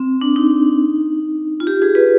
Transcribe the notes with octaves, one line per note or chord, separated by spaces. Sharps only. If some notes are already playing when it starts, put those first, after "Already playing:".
Already playing: C4
D4
D#4
F4
G4
G#4
B4